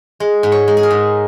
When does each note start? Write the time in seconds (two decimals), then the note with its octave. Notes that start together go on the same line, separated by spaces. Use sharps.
0.20 G#3
0.43 G#2
0.52 C#5
0.68 G#3
0.77 G#4
0.83 A#4
0.91 G#2